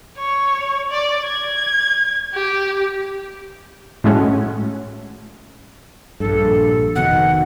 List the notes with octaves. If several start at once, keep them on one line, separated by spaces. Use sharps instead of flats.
C#5
D5
G#6
G4
A2 G#3 A3 C#4 F#4
A#1 G2 A4
F1 B2 D#3 F#5